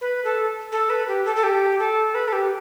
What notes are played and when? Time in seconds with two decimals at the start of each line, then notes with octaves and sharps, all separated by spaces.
0.01 B4
0.25 A4
0.72 A4
0.90 B4
1.08 G4
1.25 A4
1.36 A4
1.43 G4
1.79 A4
2.15 B4
2.28 A4
2.33 G4